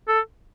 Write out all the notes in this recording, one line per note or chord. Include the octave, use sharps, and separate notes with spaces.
A4